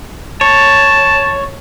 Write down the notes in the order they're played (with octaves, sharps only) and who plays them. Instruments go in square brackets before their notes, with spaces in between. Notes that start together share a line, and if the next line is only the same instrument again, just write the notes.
[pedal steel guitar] C#5 [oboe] A5